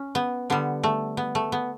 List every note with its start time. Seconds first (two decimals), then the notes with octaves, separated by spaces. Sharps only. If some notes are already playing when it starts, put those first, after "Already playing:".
Already playing: C#4
0.15 B3
0.50 D3 G3 B3
0.83 A3
1.17 B3
1.35 A3
1.52 B3